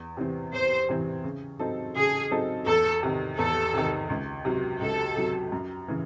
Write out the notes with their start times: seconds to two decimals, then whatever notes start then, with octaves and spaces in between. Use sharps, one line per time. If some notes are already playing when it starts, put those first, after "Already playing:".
Already playing: E2
0.17 C3 E3 C4
0.53 E2 C5
0.89 C3 E3 C4
1.24 C#3
1.59 F#3 C4 D#4 A4
1.96 C#3 G#4
2.31 F#3 C4 D#4 A4
2.66 E2 A4
3.03 C3 D#3
3.38 E2 A4
3.74 C3 D#3
4.09 C#2
4.45 C3 F#3
4.81 C#2 A4
5.16 C3 F#3
5.52 F#2
5.88 C#3 E3